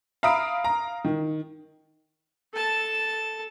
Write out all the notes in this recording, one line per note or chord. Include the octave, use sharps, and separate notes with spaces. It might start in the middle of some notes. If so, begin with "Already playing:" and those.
E5 F5 A#5 B5 D#6 D7
A#5
D#3
A4 A5